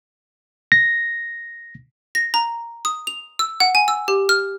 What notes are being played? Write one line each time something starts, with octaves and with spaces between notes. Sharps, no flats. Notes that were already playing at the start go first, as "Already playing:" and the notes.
A#6
A#6
A#5
D#6
F7
E6
F#5
G#5
E6
G4
F6